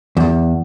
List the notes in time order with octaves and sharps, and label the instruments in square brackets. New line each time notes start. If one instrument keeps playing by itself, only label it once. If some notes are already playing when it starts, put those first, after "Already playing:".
[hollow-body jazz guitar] E2